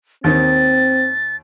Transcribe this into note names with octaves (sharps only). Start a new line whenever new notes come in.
D#2 D#3 C4 A6